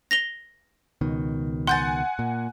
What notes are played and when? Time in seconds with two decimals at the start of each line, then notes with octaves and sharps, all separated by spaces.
0.11 A#6 F7 G7
1.01 C#2 B2 D#3
1.67 F#5 G#5 C6 G6 A6
2.19 A#2